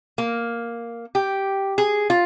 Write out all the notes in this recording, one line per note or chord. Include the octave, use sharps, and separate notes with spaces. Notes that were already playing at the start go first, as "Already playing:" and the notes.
A#3
G4
G#4
F4